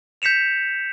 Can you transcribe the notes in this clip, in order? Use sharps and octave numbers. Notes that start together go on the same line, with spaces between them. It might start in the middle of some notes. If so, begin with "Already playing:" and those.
G6 B6 C#7 E7 F7